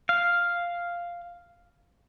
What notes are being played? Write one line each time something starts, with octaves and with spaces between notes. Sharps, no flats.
F5